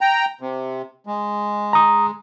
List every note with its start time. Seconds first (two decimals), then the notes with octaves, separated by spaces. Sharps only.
0.01 G5 A#5
0.41 C3
1.07 G#3
1.73 A#5 D#6